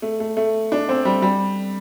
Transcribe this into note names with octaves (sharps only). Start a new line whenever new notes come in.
A3
A3
A3
D4
C4
G3
G3